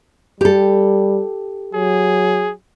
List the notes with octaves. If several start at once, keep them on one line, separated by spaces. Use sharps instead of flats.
G3 G4 A4
F#3 G#4